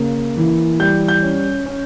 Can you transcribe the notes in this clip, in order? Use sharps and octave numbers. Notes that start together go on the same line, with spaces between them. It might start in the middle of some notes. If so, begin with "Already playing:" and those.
Already playing: C#3 A#3
E3
G3 G6
G6
C#4
C#4